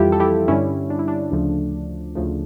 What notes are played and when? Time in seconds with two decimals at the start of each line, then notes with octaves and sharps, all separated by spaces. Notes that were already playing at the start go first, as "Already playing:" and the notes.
Already playing: F2 E3 G3 E4 F4 G4 A4
0.12 A4
0.20 E4 G4
0.48 G2 D3 G3 C#4 E4
0.90 D4
0.99 E4
1.08 D4
1.32 D2 C#3 F3 A3
2.15 D2 C#3 F3 A3